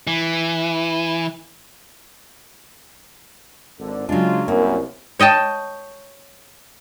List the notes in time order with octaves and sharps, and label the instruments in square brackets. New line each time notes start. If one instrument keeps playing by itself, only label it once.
[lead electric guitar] E3
[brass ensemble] G#1 D3
[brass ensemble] C#3 G#3 F4 [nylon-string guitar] F#3 D4
[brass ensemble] C2 [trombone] F#2 [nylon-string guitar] A#3
[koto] C#5 D#5 G5 A5